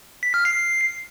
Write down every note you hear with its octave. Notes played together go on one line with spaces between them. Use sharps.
B6
F6
C7